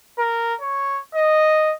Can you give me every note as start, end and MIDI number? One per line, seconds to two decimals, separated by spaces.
0.18 0.54 70
0.61 0.99 73
1.15 1.73 75